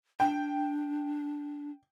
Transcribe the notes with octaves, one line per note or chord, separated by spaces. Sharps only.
D4 G5